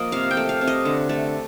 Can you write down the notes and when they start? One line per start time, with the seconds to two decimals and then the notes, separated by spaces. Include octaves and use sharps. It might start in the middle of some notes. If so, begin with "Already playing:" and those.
Already playing: F3 A#3 D#5
0.12 C3 F5
0.31 G5
0.37 A3
0.49 F5
0.61 C3
0.67 D#5
0.85 D3
1.09 A3